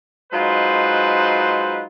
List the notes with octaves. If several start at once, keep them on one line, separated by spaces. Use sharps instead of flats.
F#3 G#3 D#4 F4 B4 C5